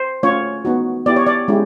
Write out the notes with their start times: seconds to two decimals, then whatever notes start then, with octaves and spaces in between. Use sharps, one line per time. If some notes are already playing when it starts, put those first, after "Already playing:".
Already playing: C5
0.23 A3 C#4 F4 C#5
0.65 B3 D#4 F#4
1.06 B3 E4 G4 D5
1.16 C#5
1.26 D5
1.48 G#3 C#4 E4 G4